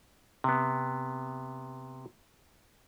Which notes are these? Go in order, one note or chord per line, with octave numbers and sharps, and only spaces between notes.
C3 B3